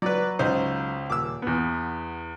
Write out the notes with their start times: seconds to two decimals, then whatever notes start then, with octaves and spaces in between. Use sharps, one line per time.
0.02 F#3 B4 D5
0.39 C#2 D#4 C5
1.10 D#1 D6 E6
1.42 E2 B3